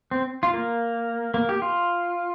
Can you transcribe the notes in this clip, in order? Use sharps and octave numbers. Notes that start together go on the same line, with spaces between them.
C4
F4
A#3
A#3
G4
F4